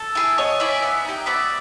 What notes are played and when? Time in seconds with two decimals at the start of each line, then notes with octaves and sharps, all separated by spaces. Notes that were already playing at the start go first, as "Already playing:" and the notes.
Already playing: A4
0.15 E4 G#4
0.38 B3 C#5 D#5
0.60 E4 G#4 D5 E5
0.82 B3
1.05 D#4 G4
1.26 B3 D5 E5